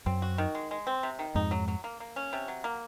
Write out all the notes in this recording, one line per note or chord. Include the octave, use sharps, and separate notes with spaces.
F#2 C4
F#4
D#3
G#3
G#3
C4
C3
D#3
F2 G#2 D#4
F#3
F#3
A#3
A#3
C#4
C3
F#3
A#3